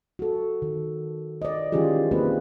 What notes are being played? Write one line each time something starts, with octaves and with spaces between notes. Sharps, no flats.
F#4 A4
D#3
D5 D#5
D#3 E3 C#4 F4 G4 G#4
A#3 C4 D#4 F4 B4